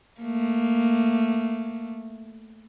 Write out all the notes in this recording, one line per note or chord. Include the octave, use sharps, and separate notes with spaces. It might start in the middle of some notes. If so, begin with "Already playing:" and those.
A3 A#3